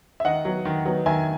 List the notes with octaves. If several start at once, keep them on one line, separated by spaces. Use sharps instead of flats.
E5
D#3 D#5 F#5
F#3 B3
D#3
F#3 B3
D#3 E5 G#5